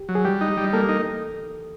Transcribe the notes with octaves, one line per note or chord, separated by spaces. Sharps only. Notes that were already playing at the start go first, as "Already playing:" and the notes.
Already playing: G4
F#3
G#4
G3 G4
D#4
G3
A#3 A4
D#4